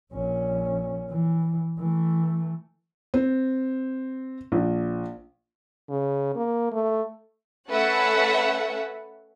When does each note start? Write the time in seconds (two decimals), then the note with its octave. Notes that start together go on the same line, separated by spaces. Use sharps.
0.13 A#1 C#4
1.09 E3
1.78 E3 A3
3.14 C4
4.52 A#1
5.90 C#3
6.35 A#3
6.72 A3
7.70 A3 C#4 A4 B4 E5 F#5